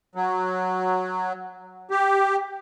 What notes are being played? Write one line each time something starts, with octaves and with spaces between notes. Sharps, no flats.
F#3
G4